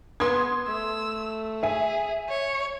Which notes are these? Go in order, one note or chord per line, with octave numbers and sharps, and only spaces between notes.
B3 C6 D#6 G#6
A3 E6
G#4 E5 G#5
C#5